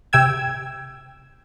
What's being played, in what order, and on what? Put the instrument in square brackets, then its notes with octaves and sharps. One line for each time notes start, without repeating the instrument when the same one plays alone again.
[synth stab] C3 G5 E6 G#6